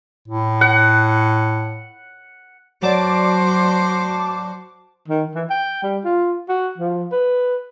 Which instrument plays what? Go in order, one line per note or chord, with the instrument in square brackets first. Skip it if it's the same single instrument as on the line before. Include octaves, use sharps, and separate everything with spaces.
[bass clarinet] A2
[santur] F#5
[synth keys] F#3 D5 [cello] F#4 C5 [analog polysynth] A5 D6
[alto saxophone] D#3
E3
G5
G3
F4
F#4
F3
B4